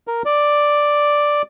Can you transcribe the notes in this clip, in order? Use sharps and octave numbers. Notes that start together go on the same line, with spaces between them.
A#4
D5